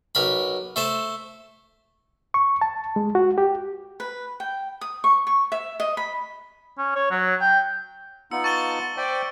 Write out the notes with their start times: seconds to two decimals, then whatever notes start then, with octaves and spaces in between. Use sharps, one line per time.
0.15 B1 A#4 B5
0.76 A3 C5 A5
2.34 C#6
2.61 A5
2.96 G#3
3.15 F#4
3.38 G4
4.00 B4
4.40 G5
4.81 D#6
5.04 C#6
5.27 C#6
5.52 E5
5.80 D#5
5.97 B5
6.78 C#4
6.96 C#5
7.11 F#3
7.41 G5
8.31 B3 D#4 F4 E6 C#7
8.44 A5 C#6 D#7 G7
8.97 C5 D5 E5 G5
9.15 D7